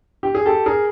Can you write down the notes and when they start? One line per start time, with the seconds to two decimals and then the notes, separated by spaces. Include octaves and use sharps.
0.23 G4
0.35 G#4
0.46 G4 A4
0.66 G#4 A#4